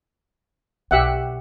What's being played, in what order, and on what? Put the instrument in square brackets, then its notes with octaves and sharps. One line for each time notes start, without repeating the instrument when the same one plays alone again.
[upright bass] B1 [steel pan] G4 E5 F#5